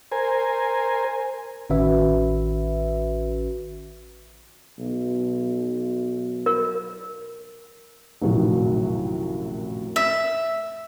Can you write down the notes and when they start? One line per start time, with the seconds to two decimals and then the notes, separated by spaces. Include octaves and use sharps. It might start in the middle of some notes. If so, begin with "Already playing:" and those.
0.12 A#4 C5 G#5
1.70 A1 D#3 C#4 F#4 B4 E5
4.79 B1
6.46 A#4
8.22 A#1 F#2 A2 C3 D#3 F#3
9.96 E5